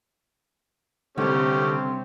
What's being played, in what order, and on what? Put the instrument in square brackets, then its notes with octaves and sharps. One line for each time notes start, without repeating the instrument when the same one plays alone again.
[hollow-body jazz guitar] C2 G#2 [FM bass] D3 [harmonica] A3 C#4 G4 [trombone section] C4